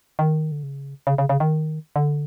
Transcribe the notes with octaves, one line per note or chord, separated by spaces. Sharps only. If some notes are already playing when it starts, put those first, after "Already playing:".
D#3
D3
C#3
C#3
C#3
C#3
D#3
D3